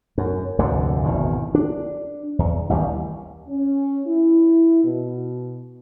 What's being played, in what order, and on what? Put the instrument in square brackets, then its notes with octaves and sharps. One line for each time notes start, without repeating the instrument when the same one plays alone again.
[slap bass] F#2
F1 D2 G#2 D3
G#1 E2 B2 D#3
D4
E2
A1 D#2 G3
[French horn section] C#4
E4
B2